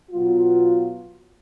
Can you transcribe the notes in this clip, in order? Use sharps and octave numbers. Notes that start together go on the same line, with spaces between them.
B2 F#3 B3 F4